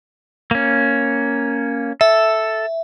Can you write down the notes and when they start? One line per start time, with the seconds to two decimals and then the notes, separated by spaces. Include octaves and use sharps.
0.51 A#3 C#4
2.01 A4 E5